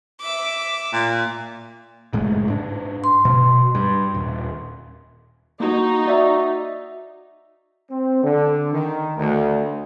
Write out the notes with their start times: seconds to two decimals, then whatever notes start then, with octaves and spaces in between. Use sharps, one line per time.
0.21 E5 D6
0.93 A#2
2.13 F#1 A2 G#3
2.50 G#2 D4
3.04 C6
3.25 B2
3.75 G2
4.14 D#1
5.60 A#3 D#4 F#4
6.06 F#4 D5 E5
7.90 C4
8.23 D3
8.73 D#3
9.17 D2